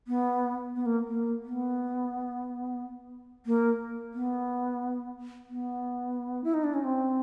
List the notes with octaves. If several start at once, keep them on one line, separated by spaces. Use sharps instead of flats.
B3
B3
A#3
A#3
B3
A#3
B3
B3
E4
D#4
D4
C#4
C4